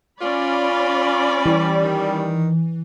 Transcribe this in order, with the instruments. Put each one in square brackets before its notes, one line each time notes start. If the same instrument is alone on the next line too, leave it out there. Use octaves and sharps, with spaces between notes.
[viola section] C#4 D5 B5 [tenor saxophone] F4
[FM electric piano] E3 [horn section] G3
[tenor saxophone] D#3